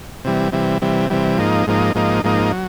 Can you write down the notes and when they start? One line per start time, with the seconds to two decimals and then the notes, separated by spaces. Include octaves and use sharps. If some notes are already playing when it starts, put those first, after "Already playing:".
0.25 C3 E3 G3
0.52 C3 E3 G3
0.82 C3 E3 G3
1.10 C3 E3 G3
1.38 G#2 F3 A#3 D#4
1.67 G#2 F3 A#3 D#4
1.95 G#2 F3 A#3 D#4
2.24 G#2 F3 A#3 D#4
2.52 F#3